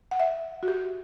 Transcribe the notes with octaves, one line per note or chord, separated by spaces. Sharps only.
F#5
E5
F#4
G4